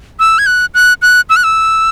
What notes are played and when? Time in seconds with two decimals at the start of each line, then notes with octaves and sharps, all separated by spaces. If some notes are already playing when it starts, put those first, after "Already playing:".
0.19 E6
0.39 G#6
0.46 F#6
0.74 F#6
1.02 F#6
1.29 E6
1.36 F#6
1.44 E6